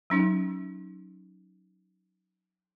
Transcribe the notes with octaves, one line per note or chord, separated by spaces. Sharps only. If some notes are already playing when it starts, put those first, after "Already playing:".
F#3 C#4 D#4